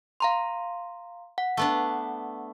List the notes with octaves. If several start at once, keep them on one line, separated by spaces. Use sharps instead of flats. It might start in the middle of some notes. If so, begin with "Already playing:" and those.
F5 A#5 C6
F#5
A3 B3 D4